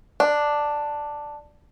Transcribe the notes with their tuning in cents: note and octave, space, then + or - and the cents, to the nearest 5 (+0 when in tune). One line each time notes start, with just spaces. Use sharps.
D4 +5